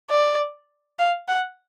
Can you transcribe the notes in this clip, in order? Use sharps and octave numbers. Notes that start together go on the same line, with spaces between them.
D5
F5
F#5